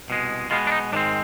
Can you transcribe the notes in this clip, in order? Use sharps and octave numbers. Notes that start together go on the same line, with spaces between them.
C2 B2 G#3
B2 G#3 B3 F4
D4
D#4
G#2 D#3 G#3 C4 D4